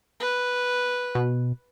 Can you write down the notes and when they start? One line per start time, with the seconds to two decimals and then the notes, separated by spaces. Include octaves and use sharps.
0.20 B4
1.15 B2